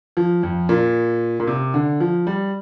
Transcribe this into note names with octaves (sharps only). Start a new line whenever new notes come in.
F3
F2
A#2
A#2
C3
D3
F3
G3